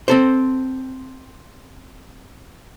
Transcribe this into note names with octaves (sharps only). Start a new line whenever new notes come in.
C4 A4 C5